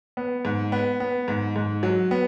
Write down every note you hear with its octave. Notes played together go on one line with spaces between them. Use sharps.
B3
G#2
B3
B3
G#2
G#2
F#3
B3